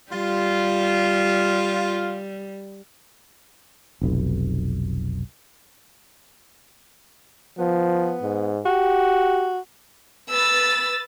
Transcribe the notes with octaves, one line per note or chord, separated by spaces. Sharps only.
G3 F4
F1 B1
F3 B3
G#2
F#4 G4
B4 E6 A6